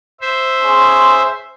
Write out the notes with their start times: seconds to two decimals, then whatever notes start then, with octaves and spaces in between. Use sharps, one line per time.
0.21 C5 E5
0.61 C#4 G#4 C6